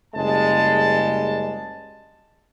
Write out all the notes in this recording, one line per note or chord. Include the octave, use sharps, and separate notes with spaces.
F#1 G3 G#3 A5